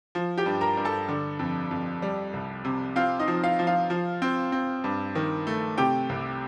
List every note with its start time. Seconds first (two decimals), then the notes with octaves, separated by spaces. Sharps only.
0.15 F3
0.38 G4 G5
0.46 G2
0.61 A#4 A#5
0.77 G2
0.85 A4 A5
1.08 D3
1.39 F2
1.71 F2
2.02 G3
2.33 C2
2.65 C3
2.96 C4 F4 F5
3.19 D#4 D#5
3.28 F3
3.43 F4 F5
3.59 F3
3.67 F4 F5
3.90 F3
4.22 C4
4.52 C4
4.84 G2
5.15 D#3
5.47 A3
5.78 C3 G4 G5
6.09 C2